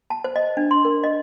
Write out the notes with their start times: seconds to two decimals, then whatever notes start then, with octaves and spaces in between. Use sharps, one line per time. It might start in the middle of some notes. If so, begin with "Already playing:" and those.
0.10 A5
0.24 C5
0.36 D#5
0.57 D4
0.71 C6
0.85 A#4
1.04 D#5